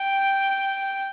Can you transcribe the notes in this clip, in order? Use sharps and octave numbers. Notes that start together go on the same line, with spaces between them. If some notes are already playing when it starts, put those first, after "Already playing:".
Already playing: G5